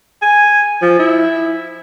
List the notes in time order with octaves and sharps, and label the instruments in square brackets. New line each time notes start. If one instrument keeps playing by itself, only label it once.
[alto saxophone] G#5
F3
E4